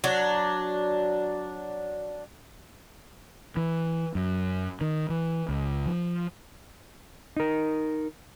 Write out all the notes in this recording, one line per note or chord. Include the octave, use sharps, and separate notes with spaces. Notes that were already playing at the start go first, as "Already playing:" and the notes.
F#3 D4
E3
F#2
D#3
E3
C#2
F3
D#4 A#4